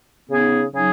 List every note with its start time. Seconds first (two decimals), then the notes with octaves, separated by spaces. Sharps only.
0.29 C#3 B3 D#4 G#4
0.72 C#3 F#3 D#4 G#4